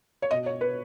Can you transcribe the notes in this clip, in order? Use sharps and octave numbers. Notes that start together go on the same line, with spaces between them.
C#5
B2 D#5
C#5
B4